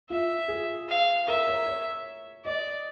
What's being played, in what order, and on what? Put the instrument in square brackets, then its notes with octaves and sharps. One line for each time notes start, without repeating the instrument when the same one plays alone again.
[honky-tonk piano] F4 [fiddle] E5
[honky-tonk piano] G#4
[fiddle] F5
[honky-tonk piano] A#4 [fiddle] E5
[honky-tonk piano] C#5
C#5
[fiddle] D5 [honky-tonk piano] D#5